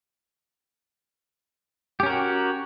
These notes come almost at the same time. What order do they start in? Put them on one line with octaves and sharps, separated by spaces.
G4 C#4 A#4 F#4